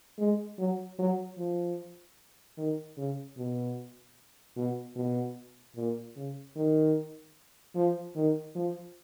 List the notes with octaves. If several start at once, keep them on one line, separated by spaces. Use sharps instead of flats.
G#3
F#3
F#3
F3
D#3
C#3
B2
B2
B2
A#2
C#3
D#3
F3
D#3
F3